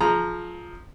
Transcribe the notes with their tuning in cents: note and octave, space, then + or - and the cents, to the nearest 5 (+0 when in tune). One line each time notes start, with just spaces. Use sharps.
F3 +5 G#4 +30 A#5 +0